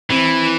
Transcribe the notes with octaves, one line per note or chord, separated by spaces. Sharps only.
E3 C4